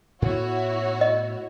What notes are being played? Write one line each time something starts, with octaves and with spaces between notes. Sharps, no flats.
A2 B3 E4 F#4 C#5
D#5